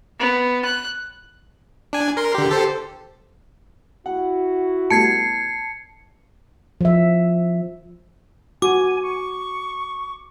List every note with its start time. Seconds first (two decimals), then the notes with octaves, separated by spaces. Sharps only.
0.19 B3
0.65 F#6
1.93 D4 G#5
2.17 A#4 C6
2.35 D3 G4
2.49 G4 A4 C5
4.06 E4 F#4 F#5
4.90 A2 G3 B3 A5 G#6 C7 C#7
6.81 F3 E5
8.62 F#4 G#5 D6
9.02 C#6